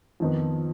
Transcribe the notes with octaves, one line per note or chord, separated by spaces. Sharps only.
F2 D#3 B3